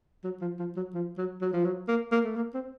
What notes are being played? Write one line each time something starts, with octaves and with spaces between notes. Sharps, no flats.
F#3
F3
F3
F#3
F3
F#3
F#3
F3
F#3
A#3
A#3
A3
A#3
C4